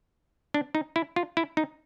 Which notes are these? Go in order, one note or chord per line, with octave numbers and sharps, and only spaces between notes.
D4
D#4
E4
F4
E4
D#4